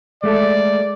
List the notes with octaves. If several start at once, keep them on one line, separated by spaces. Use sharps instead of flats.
G#3 A3 A4 D5